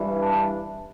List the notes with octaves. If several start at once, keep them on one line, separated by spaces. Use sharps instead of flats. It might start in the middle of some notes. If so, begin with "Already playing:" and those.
Already playing: G2 E3 G3
D4